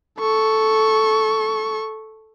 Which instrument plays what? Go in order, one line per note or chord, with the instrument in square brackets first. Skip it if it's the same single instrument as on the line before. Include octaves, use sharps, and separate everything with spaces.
[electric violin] A4 C#6